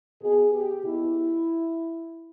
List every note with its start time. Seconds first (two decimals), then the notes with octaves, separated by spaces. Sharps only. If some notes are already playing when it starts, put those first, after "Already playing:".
0.21 B2 G#4
0.53 G4
0.84 B2 E4